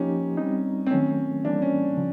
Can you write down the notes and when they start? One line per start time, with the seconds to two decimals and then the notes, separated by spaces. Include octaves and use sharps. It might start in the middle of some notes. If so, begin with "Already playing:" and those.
Already playing: F3 A#3 C#4 D#4 G4
0.37 G3 C4 D#4
0.86 C4
0.90 D#3 F#3 A3 C#4
1.44 E3 G3 A#3 D4
1.62 C#4
1.97 C#3 F3